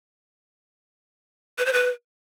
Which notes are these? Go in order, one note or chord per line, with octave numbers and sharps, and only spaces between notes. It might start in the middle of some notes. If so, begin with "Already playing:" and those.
B4
C5
B4